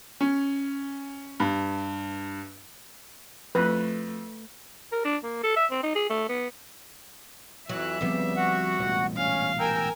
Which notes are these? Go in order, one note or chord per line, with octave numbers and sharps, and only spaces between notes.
C#4
G2
F2 A3 B4
A#4
D4
A#3
A4
E5
C4
D#4
G#4
A3
B3
F2 E3 F#3 E5 F#6
D2 C#3 F3 G3 B3 C4
F#4 F#5
E1 A1 A#2
C#4 F5
A#4 G5 G#5 A#5 E6